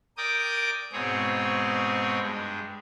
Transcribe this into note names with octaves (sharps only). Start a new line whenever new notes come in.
A#4 D5 G5 D6 D#6
G#2 B2 C4 G#4 C#5
G2 G#3